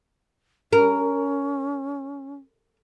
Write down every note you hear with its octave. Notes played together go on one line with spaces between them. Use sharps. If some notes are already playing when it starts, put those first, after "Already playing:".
C#4 A#4